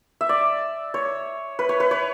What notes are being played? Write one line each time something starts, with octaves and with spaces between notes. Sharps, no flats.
E5
D5
C#5
B4
C#5
B4
C#5